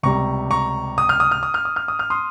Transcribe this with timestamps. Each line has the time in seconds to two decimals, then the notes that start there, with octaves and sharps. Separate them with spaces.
0.03 C#2 C3 G3 A#5 C#6
0.51 A#5 C#6
0.98 D#6
1.09 F6
1.20 D#6
1.31 F6
1.43 D#6
1.54 F6
1.65 D#6
1.76 F6
1.88 D#6
1.99 F6
2.10 C6 D#6